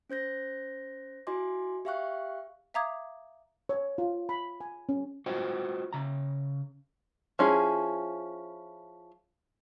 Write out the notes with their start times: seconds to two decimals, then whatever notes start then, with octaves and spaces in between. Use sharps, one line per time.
0.10 C#4 C5 G6 A#6
1.27 E4 F#4 D#5 G#5 C6 D6
1.85 G4 E5 F5 G5 C#6 F#6
2.74 E5 F5 A#5 D6 D#6 G#6
3.69 C#5
3.98 F4
4.29 B5
4.61 G#5
4.89 C#4
5.26 F4 F#4 C5 D#5 F#5 G5
5.93 C#3 A#5
7.39 F3 C#4 E4 G#4